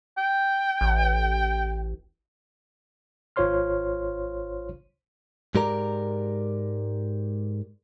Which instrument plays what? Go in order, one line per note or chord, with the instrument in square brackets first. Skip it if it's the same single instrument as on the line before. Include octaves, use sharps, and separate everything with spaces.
[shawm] G5
[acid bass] A1
[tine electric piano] G#1 F4 C5 C#5 C6 F6
[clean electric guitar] G#2 G#3 G4 A#4 D5 A#5